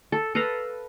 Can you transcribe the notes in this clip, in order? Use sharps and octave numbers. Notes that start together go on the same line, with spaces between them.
A4
A4 B4 F5 A#5